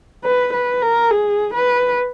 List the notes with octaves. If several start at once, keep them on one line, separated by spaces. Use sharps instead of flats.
B4
B4
A#4
G#4
B4